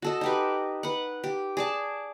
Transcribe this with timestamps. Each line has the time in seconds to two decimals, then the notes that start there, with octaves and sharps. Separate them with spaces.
0.02 F#4 A4 D#5
0.21 D#4 G4 B4
0.83 B4 F#5
1.24 G4
1.57 G#4 D5 A5